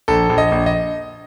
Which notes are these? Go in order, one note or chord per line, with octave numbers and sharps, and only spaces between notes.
A#1 A4
A#1
D#5
A#1
D#5